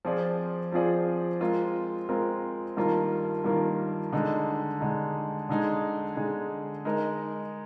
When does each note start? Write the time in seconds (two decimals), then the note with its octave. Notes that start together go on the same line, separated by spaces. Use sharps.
0.05 F3 C4 F4 G#4 D5
0.72 F3 C4 F4 G#4 D5
1.40 G#3 C4 F4 A#4
2.09 G#3 C4 F4 A#4
2.77 G2 D#3 A#3 F4 A#4
3.44 G2 D#3 A#3 F4 A#4
4.13 D3 G#3 D#4
4.81 D3 G#3 D#4
5.49 D3 G#3 D#4 G#4
6.17 D3 G#3 D#4 G#4
6.85 G#3 D#4 A#4 D#5